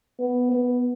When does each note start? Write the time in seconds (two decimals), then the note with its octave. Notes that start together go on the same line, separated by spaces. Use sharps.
0.20 B3
0.52 B3